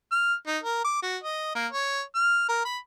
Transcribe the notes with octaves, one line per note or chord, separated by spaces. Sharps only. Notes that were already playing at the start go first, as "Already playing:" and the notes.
F6
D#4
A#4
D6
F#4
D#5
A#3
C#5
F6
A#4
B5